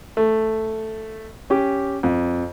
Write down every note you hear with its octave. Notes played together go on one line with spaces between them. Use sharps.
A3
C#4 G4 D6
F2